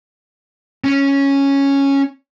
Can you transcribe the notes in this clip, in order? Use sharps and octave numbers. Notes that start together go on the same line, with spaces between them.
C#4 C#5